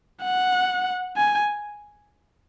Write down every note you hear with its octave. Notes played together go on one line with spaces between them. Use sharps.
F#5
G#5